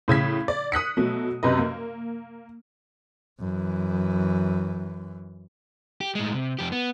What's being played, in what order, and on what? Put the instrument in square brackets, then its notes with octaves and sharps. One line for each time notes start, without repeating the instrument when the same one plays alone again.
[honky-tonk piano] A2 C#3 G#6 B6
D5
D#6 F#6 B6 C#7
B2 F#3 A3
F#2 C3 B4 D#5
A#3
[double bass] F#2 E3
[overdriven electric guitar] G4
A2 G#3
C3
F2 G4
B3